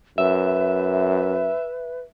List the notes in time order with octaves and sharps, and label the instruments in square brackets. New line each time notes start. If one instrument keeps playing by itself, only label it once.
[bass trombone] F#2 [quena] B4 [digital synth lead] E5